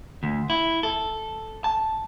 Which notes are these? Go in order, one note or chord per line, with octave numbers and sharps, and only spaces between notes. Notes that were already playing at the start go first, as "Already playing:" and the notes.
D2
E4
A4
A5